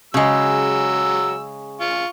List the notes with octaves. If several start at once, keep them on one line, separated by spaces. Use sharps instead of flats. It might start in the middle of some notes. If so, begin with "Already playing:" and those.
C#3 F#3 G#3 E6
F4 C#6